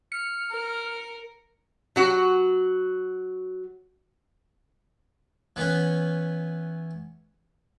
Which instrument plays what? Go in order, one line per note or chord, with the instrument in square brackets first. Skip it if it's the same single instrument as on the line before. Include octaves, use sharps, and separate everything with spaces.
[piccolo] F6 [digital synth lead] C#7
[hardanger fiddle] A#4
[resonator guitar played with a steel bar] F#3 F#4
[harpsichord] E3 B3 C#4 B4